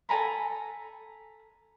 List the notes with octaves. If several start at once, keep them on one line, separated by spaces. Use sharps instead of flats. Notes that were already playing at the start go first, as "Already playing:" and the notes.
A4 G#5 A#5 B5